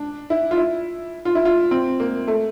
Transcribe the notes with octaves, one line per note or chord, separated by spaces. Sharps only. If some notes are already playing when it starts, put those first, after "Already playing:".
Already playing: D4
E4
F4
E4
F4
E4
F4
C4
A#3
A3